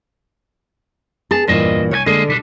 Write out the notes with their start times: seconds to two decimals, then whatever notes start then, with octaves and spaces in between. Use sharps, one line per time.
1.31 B3 G#4 A5
1.47 E2 G2 A#2 E3 C5 D#5
1.91 C2 F#4 C#5 G#5
2.06 D3 G#3 A#3 G#4
2.27 B1 G3 D4